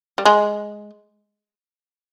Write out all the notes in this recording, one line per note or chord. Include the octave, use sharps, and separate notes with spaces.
G3
G#3